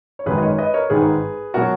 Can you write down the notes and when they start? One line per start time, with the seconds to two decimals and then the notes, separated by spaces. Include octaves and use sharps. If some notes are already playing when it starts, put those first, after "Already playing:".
0.19 C#5
0.26 G#1 F#2 D#3 G#3 G#4 B4
0.38 D#5
0.42 A#4 C#5
0.58 B4 D#5
0.74 A#4 C#5
0.90 G#1 G#2 D#3 G#3 G#4 B4
1.54 B2 F#3 F#4 A#4